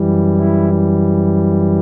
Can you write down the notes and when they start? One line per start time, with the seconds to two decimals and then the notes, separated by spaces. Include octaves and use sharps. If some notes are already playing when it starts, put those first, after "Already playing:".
Already playing: F#2 E3 G3
0.37 E4